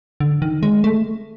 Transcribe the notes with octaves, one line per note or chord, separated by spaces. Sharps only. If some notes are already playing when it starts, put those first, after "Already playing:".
D3
D#3
G#3
A3